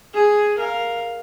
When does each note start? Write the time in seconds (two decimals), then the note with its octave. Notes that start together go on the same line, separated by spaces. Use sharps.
0.14 G#4 G#5
0.58 A#4 F5